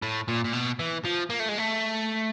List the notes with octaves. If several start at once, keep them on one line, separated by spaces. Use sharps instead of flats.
A2
A#2
A#2
B2
E3
F3
A#3
A3
G#3
A3